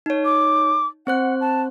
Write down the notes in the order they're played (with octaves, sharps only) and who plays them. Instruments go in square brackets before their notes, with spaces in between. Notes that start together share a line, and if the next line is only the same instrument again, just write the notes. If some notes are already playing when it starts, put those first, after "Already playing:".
[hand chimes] D#4 C#5
[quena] D6
[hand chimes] C4 C5 F#6 [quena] F#5
[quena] A5